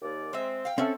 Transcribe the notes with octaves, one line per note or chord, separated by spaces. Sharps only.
D#2 D5
G#3 C4 E5
F5 G5
C4 C#4 A4 E5